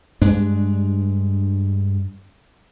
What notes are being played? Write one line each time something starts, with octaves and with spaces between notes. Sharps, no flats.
G2 G#3 D4